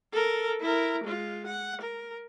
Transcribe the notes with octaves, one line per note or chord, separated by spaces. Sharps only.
A4 A#4
E4 A#4
G#3 F4
F#5
A#4